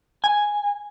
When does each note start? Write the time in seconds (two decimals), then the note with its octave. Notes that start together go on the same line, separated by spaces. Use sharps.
0.24 G#5